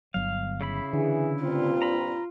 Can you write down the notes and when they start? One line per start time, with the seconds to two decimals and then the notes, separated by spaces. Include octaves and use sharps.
0.14 G1 F#3 F5
0.61 C#3 E4 B5
0.93 D3 E3 G#4
1.43 G2 A#2 C4 F4
1.82 A#5 B5